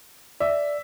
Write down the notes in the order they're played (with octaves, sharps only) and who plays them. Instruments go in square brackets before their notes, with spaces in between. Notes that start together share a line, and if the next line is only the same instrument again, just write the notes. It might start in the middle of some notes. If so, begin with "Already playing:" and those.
[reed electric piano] D5 [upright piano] E5